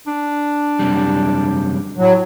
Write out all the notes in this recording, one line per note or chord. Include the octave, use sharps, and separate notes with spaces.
D4
F#2 C3 G3
A2 F#3